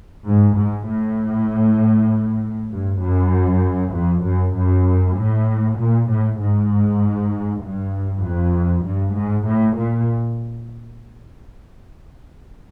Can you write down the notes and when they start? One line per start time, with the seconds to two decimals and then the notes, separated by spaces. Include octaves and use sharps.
0.25 G#2
0.54 G#2
0.86 A2
2.70 G2
3.01 F#2
3.93 F2
4.23 F#2
4.55 F#2
5.16 A2
5.77 A#2
6.08 A2
6.39 G#2
7.62 G2
8.23 F2
8.85 G2
9.15 G#2
9.46 A2
9.76 A#2